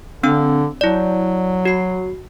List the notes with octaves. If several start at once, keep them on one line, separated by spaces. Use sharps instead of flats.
D3 C4 D4 E6
F#3 E4 D5
F#4 C7